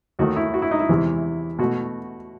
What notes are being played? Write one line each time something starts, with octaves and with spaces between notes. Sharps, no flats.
D#2 D#3 A3 F#4
E4
F#4
E4
D#4
E4
E2 C3 E3
B2 A3 F#4